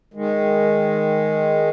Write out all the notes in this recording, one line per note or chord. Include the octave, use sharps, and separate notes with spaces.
D#3 G#3